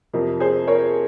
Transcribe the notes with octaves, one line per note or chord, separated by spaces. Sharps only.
F2 C3 F3 A#4
G#4 C5
A#4 C#5